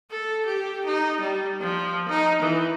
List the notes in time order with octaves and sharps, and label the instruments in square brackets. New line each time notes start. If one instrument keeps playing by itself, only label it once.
[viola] A4
G4
D#4
G3
F3
D#4
E3